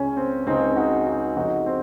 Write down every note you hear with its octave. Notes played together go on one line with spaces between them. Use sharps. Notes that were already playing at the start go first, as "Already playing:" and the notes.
Already playing: C#2 C#3 C#4
C4
C#2 C#3 C4 D#4
D#4 F#4
D#4 F#4
F2 C#3 D#4 F#4
C4